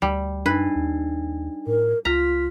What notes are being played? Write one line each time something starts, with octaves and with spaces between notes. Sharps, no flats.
D2 G3
F#2 D4 D#4 B4
D#2
A2 A#4
C#2 F4 A#5 F6 B6